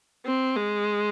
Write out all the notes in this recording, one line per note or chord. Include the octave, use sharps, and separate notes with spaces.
C4
G#3